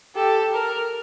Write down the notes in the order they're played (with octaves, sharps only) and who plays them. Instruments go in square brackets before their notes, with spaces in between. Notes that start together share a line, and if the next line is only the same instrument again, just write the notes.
[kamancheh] G4 [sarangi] A4
[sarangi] A#4